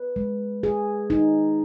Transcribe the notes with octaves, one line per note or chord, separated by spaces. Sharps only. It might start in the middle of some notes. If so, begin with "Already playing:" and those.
Already playing: B4
G#3
G#4
D#4